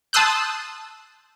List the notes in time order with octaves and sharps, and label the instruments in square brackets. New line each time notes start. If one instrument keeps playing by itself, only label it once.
[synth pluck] A5 C6 D#6 E6 F#6 G6